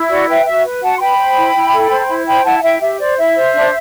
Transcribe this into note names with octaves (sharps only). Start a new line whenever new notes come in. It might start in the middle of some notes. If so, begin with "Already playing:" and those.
Already playing: E4
F#4 D5 F#5
B4 E5 G5
F#4 E5
B4
F#4 F#5 A5
C6
B4 G5 B5
C5
E4
E4
A4
C5
E4
C5 G5 B5
E4 F#5 A5
F#5
E4 E5 G5
G4 E5
C5 D5
E4 E5
C5
D4